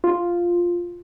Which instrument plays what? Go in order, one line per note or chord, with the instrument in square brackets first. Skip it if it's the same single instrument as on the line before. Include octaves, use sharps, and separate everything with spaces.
[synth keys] F4